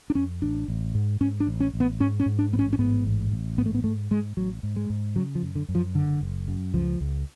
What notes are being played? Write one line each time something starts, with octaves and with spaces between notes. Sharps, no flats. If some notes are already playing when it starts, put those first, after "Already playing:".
D4
F2 C#4
A1 D4
A1
G#2
G#2 C#4
D4
A1
C#4
A1
B3
G#2 C#4
C#4
G#2
D4
A1 B3
C#4
C#4
G#2 B3
A1
A1
G#2 B3
A3
B3
G#2 A3
G#2 G#3
A1 F#3
G#2
G#3
G#2
C#3 F#3
F3
F#2
D3
F#2
F3
F#1 D3
F#1
F#2
C#2 F3
C#2